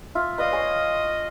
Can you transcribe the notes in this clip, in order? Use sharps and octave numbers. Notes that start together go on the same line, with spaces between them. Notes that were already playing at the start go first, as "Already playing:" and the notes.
F4 E5
B4 D5 D#5 F5
C#5 G#5 C6